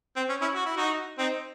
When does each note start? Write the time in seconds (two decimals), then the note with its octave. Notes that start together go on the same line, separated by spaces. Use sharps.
0.16 C4
0.29 C#4
0.41 C#4 E4
0.55 F#4
0.66 E4
0.77 D#4 F#4
1.18 C4 D#4